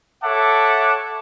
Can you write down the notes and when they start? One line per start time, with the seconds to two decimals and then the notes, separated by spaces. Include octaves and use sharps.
0.24 A4 C#5 E5 F#5 A5 D6